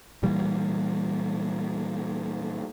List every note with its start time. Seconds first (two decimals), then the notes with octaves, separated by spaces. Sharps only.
0.23 A#2 E3 G3